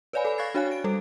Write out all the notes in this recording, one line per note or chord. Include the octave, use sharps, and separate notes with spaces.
B4 C#5 D5 F5 G#5 B5
A4 G#5 B5
F5 C#6 F#6 G#6 A6 C7
D4 F#4 C#5 F5 G#5 F#6
D7
G3 A4